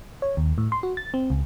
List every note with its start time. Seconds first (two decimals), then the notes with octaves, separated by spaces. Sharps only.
0.22 C#5
0.37 D#2
0.58 A2
0.72 C6
0.83 F#4
0.97 A6
1.14 C4
1.30 C#2